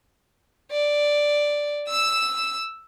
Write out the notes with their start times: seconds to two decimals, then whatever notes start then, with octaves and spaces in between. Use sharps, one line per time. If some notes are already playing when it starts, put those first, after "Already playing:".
0.72 D5
1.89 E6 E7